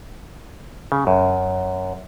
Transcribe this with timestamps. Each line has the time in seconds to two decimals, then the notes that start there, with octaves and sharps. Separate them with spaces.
0.92 C#3
1.07 F#2